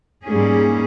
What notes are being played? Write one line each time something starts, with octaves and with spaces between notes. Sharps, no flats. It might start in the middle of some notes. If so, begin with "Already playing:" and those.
G#2 G3 A#3 C#4 G#4